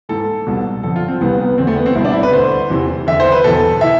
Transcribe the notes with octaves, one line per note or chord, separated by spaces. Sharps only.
G#2 E3 A4
C2 B2
F2 D3 A4
F4
C4
C2 C3 E3 B3
B3
E2 D3 C4
A3
B3
C4
C2 B2 E4
D4
E4
B4
D2 D3 C5
E2 C3 E3
E2 D3 E5
C5
B4
E2 B2 A4
E3 E5